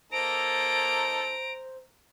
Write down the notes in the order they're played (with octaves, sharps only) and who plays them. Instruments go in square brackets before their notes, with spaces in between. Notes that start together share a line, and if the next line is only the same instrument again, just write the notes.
[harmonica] A#3 D#4 A4 [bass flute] C5 [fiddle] A#5 [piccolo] D7